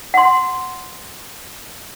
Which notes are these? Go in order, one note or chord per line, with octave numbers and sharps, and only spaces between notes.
F#5 C6